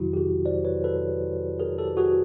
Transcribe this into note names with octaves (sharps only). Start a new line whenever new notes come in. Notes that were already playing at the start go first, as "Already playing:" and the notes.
Already playing: F2 C3 D#3 F#3 E4 F#4
G4
F#4 G#4
C5 D5
B4 C#5
A4 B4
G#4 A#4
G4 A4
F#4 G#4